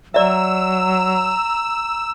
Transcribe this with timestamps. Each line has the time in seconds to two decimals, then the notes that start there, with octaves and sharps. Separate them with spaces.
0.14 F#3 D5 E5 A#5 E6